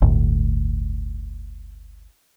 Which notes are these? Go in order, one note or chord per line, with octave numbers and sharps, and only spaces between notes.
G1 D2 A2